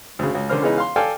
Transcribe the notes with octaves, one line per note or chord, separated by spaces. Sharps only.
D2 C#3
C#2
D3 C#4 A#4 C5 F6
C#3 E3 G#3 B3 C#4 D#4
F5 C6
A4 D5 F5 G5 G#5